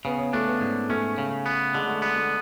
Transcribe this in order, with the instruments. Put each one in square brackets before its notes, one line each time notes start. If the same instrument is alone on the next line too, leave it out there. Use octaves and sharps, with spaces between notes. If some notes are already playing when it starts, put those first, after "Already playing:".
[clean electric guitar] C#3 [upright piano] B3
[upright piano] C#4
[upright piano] A3 [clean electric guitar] D4
[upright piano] B3
[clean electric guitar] G#2
[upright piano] A3 [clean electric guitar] C#4
[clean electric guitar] C#3
B3
[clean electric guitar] D3 [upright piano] G#3
[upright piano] A3
[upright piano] G#3 [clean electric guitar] B3
[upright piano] A3